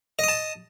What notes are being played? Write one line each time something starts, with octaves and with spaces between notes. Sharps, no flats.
D#5 A5 D#6